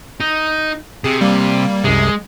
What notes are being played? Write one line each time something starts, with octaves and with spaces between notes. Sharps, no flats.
D#4
C3 G#4
G3 A#3
C2 F#2 C3 G#3